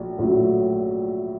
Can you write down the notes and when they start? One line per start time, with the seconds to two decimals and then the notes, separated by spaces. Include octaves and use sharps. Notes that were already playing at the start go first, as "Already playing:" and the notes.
Already playing: A#1 A2 F#3
0.19 A#1 A2 F#3